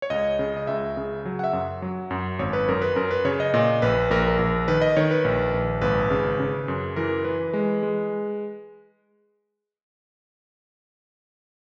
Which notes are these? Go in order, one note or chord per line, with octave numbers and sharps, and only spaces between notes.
C#5
C#2 D#5
C#3
D#5
C#2 E5
C#3
F#3
F#5
E5
F#2
F#3
F#2
G#1 C#5
B4
F#2 A#4
B4
F#2 A#4
B4
C#3 C#5
D#5
A#2 D#5
A#1 B4
A#1 A#4
A#4
A#1
D#3 B4
D#5
D#3 C#5
B4
A#1
A#1
G#1 B4
C#3
C#3
F#2
E3 A#4
E3 B4
G#3
G#3